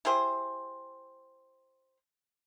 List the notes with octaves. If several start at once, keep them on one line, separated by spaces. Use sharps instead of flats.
E4 G4 G#4 C5